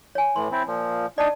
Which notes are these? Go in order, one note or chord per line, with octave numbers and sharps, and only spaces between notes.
C#5 G#5
A2 E3 C6
C4 E4
A#2 F3
D4 D#4 D5 A5